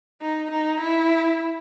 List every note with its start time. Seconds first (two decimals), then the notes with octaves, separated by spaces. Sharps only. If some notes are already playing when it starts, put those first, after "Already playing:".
0.21 D#4
0.51 D#4
0.81 E4